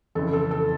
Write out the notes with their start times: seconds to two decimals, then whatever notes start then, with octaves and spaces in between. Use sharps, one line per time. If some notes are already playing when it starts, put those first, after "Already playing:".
0.15 F2 C#3 E3 A4
0.33 A4
0.51 A4